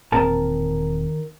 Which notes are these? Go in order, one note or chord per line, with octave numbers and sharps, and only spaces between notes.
E1 A#2 D#3 C4 A#4 A5